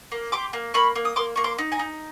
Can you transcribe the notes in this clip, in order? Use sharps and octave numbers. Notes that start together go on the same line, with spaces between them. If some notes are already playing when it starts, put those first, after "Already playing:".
A#3
G4 C6 D6
A#3
A#3 B5 C#6
A#3
D#6
A#3 C6 D6
A#3 C#6
C6 D6
D#4
G#5 A#5
D#4